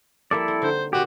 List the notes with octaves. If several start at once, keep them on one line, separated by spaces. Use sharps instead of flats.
F3 G3 A#3 E4 A4 D5
C4
D3 D#4 C5
A#2 B3 C4 F#4 G4